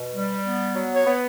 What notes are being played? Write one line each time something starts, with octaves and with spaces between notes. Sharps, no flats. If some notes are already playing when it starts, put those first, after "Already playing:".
Already playing: B2
G3
B3
F#3
C#5
B3